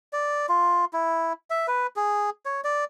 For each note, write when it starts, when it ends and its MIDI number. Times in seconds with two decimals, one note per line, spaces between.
0.13 0.46 74
0.49 0.85 65
0.93 1.33 64
1.50 1.66 76
1.68 1.87 71
1.96 2.30 68
2.45 2.61 73
2.64 2.84 74